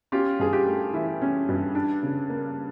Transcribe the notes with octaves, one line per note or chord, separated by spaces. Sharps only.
C#4 F4 G4
G2 G#4
F4 G4
A3
E3 E4
C#4
G2
D4
C#3
A#3